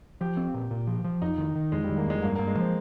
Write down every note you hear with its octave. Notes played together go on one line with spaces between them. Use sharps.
F3 G4
C4
A#2
A#2
F3
F3
F2 D#4
D#3
D#3
F2 G#3
D#3 G3
A#3
F2 G#3
G2 A#3
G2 A#3
G#3
F3 C4